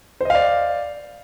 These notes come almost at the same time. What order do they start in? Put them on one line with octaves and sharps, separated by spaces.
C5 D#5 F5 D5